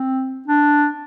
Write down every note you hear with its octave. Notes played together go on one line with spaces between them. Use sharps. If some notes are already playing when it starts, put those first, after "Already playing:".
Already playing: C4
D4